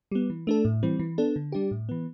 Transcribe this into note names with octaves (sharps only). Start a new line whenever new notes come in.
G3 B3
E3
A3 D4 A4
A2
E3 G3 C4
E3
B3 D4 A4
D3
G3 D4 G4
A2
E3 B3